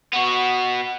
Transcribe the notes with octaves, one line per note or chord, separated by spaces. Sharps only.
B3 F#4